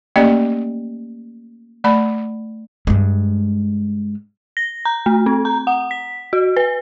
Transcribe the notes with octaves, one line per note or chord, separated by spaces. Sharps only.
A3 A#3 C#4 G4 D5 D#5
A3 D5 A5 B5
G2 G#3
A#6
A#5
A3
C4
A#5
F#5
B6
F#4
B4